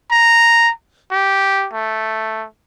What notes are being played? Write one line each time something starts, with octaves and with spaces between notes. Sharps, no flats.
A#5
G4
A3